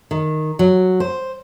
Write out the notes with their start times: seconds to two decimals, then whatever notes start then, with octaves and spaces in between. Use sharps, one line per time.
0.11 D#3
0.59 F#3
1.00 C5